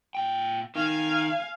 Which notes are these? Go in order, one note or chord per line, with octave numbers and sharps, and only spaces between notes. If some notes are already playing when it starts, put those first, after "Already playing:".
A#2 G5
D#3 F5 G#5